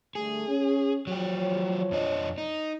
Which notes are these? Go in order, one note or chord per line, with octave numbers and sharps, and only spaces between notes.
D3 G3 A3 G#4
C#4
F3 F#3 G4 C#5
F2 D4 D#5
D#4